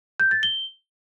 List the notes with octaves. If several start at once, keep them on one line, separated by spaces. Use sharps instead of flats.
G6
A6
G7